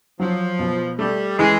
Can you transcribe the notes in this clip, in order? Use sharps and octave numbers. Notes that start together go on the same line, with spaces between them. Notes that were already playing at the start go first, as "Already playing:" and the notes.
F3 F#3
B2
G3 A3
E3 G#3